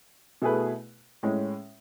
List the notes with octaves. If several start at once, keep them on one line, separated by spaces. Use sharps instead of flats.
B2 A3 E4 G#4 B4
A2 G#3 C#4